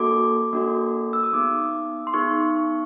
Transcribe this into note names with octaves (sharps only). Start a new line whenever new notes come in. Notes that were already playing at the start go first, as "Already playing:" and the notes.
Already playing: A#3 D4 F#4 A4 D6
A#3 D4 F#4 A4
E6
D#6
B3 D#4 G#4 D6
C6
B3 D#4 G#4 C#6